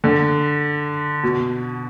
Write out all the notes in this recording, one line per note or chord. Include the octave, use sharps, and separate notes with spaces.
D3
B2